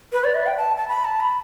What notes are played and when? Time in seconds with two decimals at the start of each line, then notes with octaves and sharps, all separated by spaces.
0.13 B4
0.24 D5
0.35 E5
0.46 G5
0.57 A5
0.77 A5
0.88 B5
1.05 A5
1.20 B5